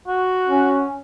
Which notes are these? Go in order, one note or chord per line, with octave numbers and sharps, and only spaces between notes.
F#4
C#4